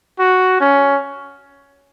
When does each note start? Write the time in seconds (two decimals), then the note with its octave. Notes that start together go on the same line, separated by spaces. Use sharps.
0.19 F#4
0.61 C#4